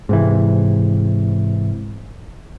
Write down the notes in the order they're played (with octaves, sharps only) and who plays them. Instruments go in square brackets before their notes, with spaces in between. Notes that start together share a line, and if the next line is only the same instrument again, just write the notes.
[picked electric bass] G#2 C3 E3